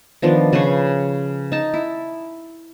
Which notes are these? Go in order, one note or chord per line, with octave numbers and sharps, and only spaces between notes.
D#3 F3 B3 D4
C#3 B4 C6 C#6
D#4 A5
E4